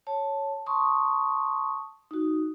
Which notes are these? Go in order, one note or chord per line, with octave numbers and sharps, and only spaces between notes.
C#5 A5
A5 C6 C#6 D#6
D#4 F#4